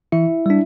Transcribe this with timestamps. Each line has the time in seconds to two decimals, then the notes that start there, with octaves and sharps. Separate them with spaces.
0.12 E3 E4 E5
0.46 G3 D4